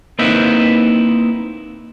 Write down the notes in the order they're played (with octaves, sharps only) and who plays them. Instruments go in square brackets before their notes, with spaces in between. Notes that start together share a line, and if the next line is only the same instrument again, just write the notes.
[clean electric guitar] A#3 C4 D#4 E4 B4